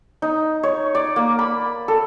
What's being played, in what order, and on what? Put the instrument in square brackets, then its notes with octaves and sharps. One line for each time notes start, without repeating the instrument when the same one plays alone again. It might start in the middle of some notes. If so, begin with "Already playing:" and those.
[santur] D#4
C#5
D5
A#3
B5
A4